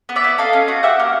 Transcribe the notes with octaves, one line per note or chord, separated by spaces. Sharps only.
B3
D5 E5
E4
A4 D#5 F5
C#4
F#4
G4 E5 F#5
A#3